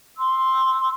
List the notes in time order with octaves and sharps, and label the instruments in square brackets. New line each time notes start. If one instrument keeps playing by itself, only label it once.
[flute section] C6 E6